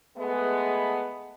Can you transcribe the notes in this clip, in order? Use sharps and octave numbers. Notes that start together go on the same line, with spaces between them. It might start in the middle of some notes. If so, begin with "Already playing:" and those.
G#3 A3 B3